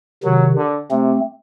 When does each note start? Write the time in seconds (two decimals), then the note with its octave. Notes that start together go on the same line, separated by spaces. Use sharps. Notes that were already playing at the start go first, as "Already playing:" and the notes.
0.24 C3 D#3 F#3
0.56 D3
0.90 C3 A3 C4